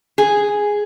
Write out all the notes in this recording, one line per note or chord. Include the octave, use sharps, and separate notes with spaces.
G#4